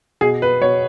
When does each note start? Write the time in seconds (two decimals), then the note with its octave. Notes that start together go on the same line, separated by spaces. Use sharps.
0.21 B2 G#4
0.42 B4
0.61 B2 C#5